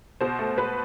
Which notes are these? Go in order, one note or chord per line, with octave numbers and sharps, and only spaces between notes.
B2 C5
A3
B2 B4